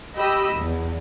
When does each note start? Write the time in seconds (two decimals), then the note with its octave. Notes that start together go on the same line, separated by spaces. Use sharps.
0.16 G4 D#5 B5 E6
0.56 E2